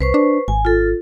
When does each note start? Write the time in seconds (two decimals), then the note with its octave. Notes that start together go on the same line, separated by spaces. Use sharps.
0.01 C2 B4 C5 C#6
0.14 D4
0.48 G#1 G#5
0.65 F4 A4